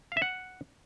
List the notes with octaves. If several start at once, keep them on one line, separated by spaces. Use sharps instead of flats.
F5
E5
F#5